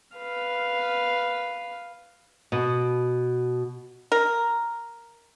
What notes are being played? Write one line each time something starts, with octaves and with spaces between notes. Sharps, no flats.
B4 F5
B2
A#4